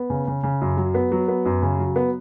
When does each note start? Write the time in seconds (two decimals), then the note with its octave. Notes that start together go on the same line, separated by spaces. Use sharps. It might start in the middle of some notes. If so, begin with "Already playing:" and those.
Already playing: B3
0.10 C#3
0.27 C#3
0.43 C#3
0.61 F#2
0.77 F#3
0.95 B3
1.12 F#3
1.28 B3
1.46 F#2
1.62 C#3
1.79 F#3
1.96 B3